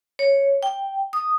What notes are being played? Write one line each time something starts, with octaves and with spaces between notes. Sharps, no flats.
C#5
G5
D#6